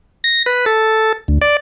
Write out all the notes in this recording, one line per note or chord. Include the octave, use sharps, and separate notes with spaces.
A#6
B4
A4
D2
D5